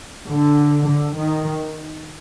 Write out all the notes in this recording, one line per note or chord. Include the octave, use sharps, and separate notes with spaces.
D3
D3
D#3